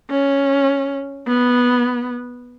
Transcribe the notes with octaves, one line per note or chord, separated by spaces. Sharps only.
C#4
B3